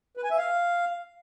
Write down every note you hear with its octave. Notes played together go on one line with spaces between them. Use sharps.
B4
G#5
E5
F5